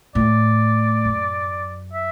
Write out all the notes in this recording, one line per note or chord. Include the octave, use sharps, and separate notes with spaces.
A2 D5
F#2
E5